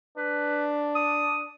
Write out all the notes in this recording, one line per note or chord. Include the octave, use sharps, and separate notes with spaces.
D4 B4
D#6